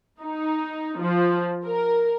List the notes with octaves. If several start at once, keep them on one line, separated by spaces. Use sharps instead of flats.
D#4
F3
A#4